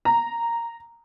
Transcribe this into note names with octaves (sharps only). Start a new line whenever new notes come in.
A#5